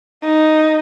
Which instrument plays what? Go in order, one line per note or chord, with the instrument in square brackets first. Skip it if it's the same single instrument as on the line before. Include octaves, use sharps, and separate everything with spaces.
[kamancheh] D#4